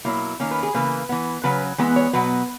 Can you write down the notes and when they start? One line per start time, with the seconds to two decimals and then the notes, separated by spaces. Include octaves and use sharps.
0.05 B2 F#3 A#3 E4
0.40 D#3 A#3 C#4
0.51 B4
0.63 G#4
0.74 C#3 E3 A#3 B4
1.09 E3 B3
1.43 C#3 F#3 C#4 B4
1.78 E3 G#3 B3
1.96 C#5
2.13 B2 F#3 B3 B4